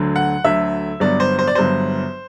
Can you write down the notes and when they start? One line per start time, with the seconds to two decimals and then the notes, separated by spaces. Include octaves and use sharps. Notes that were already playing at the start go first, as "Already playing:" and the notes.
Already playing: D2 D3 F#3
0.16 F#5
0.44 D2 D3 F#3 E5
1.00 G1 G2 F#3 B3 D5
1.20 C5
1.39 C5
1.47 D5
1.55 G1 G2 F#3 B3 C5